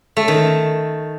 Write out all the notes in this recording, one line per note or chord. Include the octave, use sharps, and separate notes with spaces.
A3
D#3